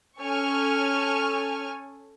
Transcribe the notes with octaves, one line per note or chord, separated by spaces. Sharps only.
C#4 A4 G#5 C#6 F6